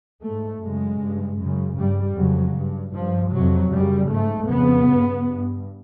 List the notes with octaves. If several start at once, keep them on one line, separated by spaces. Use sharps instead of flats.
G#2 A3
F#2 C#3 G#3
G2
F#2 C#3
G2 G3
F2 C#3 F#3
G2
G2 F3
F2 C3 F#3
F#2 C#3 G3
G#2 A3
F2 C#3 B3
G2
G2